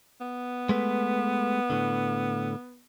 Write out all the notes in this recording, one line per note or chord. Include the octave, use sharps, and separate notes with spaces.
B3
G#3 A3 B4
A2 D3